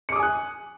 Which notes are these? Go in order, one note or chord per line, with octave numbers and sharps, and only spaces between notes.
G#5 D6 D#6 F#6 C#7